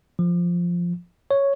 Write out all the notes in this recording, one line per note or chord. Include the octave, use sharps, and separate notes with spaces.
F3
C#5